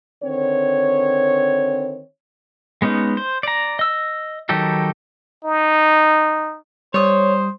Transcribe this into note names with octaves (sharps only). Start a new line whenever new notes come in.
D3 D#3 C4 C#5
G#3 B3 C#4 D#4
C5
D5 A#5
D#5 E6
D#3 F#3 D#4 G4 A4
D#4
G3 C5 C#5 D#6